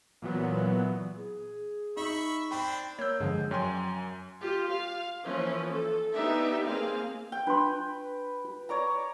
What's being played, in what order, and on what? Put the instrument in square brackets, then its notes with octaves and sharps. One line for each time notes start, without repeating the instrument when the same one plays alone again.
[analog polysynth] A#2 E3 F#3 B3
[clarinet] G#4
[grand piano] D#4 [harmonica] E5 B5 C#6
[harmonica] C4 D4 [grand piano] G5 B5
[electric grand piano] A#3 G6 [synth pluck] C#5 E6
[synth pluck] G2 D3 F3 [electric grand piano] G#3
[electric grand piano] F#2 G#5 [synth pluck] C#5 G5 C6
[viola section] F4 G4
F5
E3 F3 A#3 C#4
A4
B3 D4 D#4 G4 B4 E5
A#3 C4 G#4 F5
[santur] G5
[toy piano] D4 F4 C6 [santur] B4
[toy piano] F4
[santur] C#5 D5 A#5